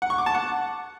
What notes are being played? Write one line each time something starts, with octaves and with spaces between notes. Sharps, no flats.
F#5
C#6
D6
A5
F#5